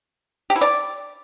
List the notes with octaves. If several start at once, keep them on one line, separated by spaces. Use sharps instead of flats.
G4
E4
D5